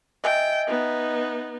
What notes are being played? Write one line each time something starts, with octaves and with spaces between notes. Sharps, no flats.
D#5 E5 G5 G#5
B3 D#4